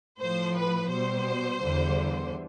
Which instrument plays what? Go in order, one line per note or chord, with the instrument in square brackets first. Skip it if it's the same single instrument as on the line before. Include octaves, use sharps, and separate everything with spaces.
[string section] A2 F3 C5
B4
B2 G3 C5
E2 D3 G3